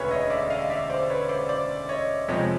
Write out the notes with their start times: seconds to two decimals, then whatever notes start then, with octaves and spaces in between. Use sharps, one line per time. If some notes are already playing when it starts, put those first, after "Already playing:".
Already playing: E1 D2 C#3 B4 C#5
0.10 C#5 D#5
0.30 D5 E5
0.50 D#5 F5
0.70 D5 E5
0.90 C5 D5
1.10 B4 C#5
1.29 C5 D5
1.49 C5 D5
1.89 C#5 D#5
2.28 F2 C3 F3 G#3 C#5 D#5